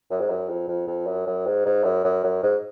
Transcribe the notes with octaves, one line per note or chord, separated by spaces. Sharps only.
F#2
G#2
F#2
F2
F2
F2
F#2
F#2
G#2
G#2
F#2
F#2
F#2
G#2